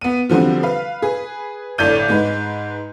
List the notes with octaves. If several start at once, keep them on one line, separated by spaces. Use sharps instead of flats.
B3 D#7
D3 F3 G3 C4 F#4
B4 F5
G#4 B4
G1 A2 D5 G6 D#7
G#2 G#3 B4